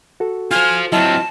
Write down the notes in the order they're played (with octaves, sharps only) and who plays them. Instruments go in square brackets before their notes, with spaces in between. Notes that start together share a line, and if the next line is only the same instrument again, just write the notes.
[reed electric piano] F#4 A4
[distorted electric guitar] F4 C5 [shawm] G#5 [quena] F6
[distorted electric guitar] F#3 C4 [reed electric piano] E4 D#5 [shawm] F4 [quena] A5